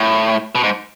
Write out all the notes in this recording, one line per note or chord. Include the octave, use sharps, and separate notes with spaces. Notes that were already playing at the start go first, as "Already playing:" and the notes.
Already playing: A2
B2
G#2